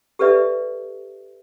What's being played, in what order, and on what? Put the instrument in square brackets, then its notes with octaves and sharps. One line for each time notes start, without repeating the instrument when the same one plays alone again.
[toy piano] G4 A4 B4 D5 E5